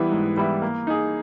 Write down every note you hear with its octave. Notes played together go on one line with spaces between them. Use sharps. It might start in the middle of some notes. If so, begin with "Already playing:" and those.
Already playing: E3 G3 B3 E4
G#2
E3 G3 B3 E4
A#3
D#4 G#4